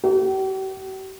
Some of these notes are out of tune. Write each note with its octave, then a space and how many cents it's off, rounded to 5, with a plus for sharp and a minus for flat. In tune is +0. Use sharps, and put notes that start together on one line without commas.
G4 -45